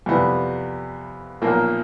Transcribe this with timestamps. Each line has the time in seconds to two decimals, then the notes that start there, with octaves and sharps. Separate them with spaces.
0.06 F2 C3 E3 G3 B3
1.42 B1 A#2 F3 A#3